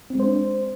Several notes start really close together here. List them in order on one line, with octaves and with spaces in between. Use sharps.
C4 G#3 C5 D4